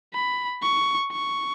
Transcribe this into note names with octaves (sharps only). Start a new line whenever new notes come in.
B5
C#6
C#6